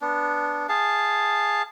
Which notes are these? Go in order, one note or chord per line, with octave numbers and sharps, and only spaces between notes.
B3 D4
G#4 F5 A5